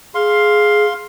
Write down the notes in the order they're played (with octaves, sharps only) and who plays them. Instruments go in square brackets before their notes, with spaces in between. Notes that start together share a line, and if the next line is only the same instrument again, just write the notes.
[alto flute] G#4 [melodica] F5 C6